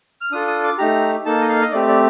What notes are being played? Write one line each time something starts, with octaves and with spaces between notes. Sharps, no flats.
F6
D4 F4 A4 D#6
D#6
D6
A3 D#4 G4 A#5
A#3 D#4 A4 A5
D#5
F5
D#5
A3 C4 G4 D5
D5